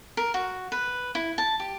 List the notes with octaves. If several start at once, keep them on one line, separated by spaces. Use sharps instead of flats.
A#4
F#4
B4
E4
A5
G4